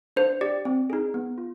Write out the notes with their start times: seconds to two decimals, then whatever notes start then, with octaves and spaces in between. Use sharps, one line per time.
0.16 D4 C5
0.41 G4 D5
0.65 C4
0.90 D#4 G#4
1.14 B3
1.38 F4